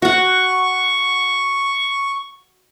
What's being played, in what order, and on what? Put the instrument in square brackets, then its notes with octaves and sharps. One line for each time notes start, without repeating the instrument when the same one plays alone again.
[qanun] F#4 F#5 [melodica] C#6